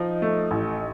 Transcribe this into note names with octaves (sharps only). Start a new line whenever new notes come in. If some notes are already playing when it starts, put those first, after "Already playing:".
Already playing: F3 D#4
A3
A1